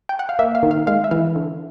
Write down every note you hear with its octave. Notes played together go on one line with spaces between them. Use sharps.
G5
F#5
F5
A#3 E5
F5
D#3
F5
G#3 F5
E5
E3 F5
D3